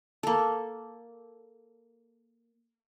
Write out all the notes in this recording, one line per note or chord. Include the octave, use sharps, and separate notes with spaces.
A#3 A4